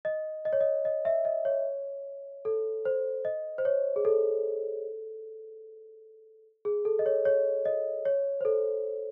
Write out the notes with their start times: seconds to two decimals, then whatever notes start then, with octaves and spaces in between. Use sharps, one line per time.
0.05 D#5
0.45 D#5
0.53 C#5
0.61 D#5
0.85 D#5
1.05 E5
1.25 D#5
1.45 C#5
2.45 A4
2.85 C5
3.25 D#5
3.58 C5
3.65 C#5
3.96 G#4
4.05 A4
6.65 G#4
6.85 A4
6.99 D#5
7.06 C#5
7.25 C#5
7.65 D#5
8.05 C#5
8.41 C5
8.45 A4